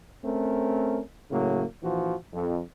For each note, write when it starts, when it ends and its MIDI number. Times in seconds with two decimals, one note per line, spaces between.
0.24 1.01 57
0.24 1.01 60
0.24 1.01 61
0.24 1.01 70
1.31 1.64 45
1.31 1.64 49
1.31 1.64 54
1.31 1.64 58
1.83 2.14 34
1.83 2.14 52
1.83 2.14 53
1.83 2.14 66
2.33 2.61 41